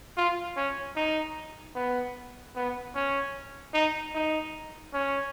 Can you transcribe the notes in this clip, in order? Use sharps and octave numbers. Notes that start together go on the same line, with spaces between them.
F4
C#4
D#4
B3
B3
C#4
D#4
D#4
C#4